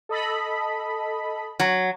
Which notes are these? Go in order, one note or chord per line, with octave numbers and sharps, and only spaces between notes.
A4 D#5 B5
F#3